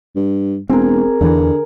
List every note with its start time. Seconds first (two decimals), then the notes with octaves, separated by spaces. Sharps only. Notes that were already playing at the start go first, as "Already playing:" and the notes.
0.16 G2
0.69 E1 C4 G#4 A#4
1.21 E2 D3 E3